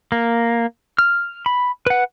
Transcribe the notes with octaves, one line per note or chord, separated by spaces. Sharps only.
A#3
F6
B5
B4 F#5